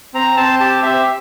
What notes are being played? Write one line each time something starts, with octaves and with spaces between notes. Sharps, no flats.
C4 A#5
C4 A5
G4 A5
G4 E5